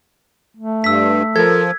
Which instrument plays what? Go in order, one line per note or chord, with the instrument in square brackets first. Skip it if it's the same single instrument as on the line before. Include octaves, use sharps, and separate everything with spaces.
[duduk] A3
[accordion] G2 [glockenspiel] E6 B6
[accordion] F3 [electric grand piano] A4 A#4 [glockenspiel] G#6